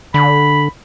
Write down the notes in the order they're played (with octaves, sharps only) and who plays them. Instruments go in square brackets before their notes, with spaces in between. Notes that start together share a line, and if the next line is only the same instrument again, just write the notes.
[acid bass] D3 [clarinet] B5